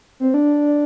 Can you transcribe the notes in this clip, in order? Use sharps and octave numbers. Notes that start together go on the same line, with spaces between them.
C4
D4